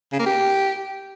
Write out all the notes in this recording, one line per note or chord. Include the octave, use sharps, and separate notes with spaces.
C#3
A#3
G4